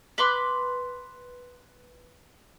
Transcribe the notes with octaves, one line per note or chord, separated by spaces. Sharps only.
B4 C6 D6